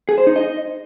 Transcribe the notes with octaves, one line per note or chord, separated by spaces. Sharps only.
G#4
C5
D#4
D#5